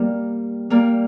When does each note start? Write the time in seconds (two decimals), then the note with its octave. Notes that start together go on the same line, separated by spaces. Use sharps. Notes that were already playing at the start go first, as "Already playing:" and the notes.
Already playing: G3 A#3
0.70 G3 A#3